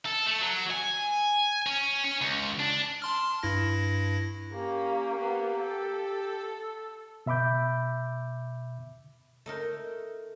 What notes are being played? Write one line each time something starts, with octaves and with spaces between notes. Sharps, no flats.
A4
A3
F#3
G#5
C#4
C#4
C#2
D4
A5 C6 F6
G2 E4 A#6
A#3 C#4 G4
A#3 B3
A4
B2 E5 B5 D6 G6
A3 D#4 A#4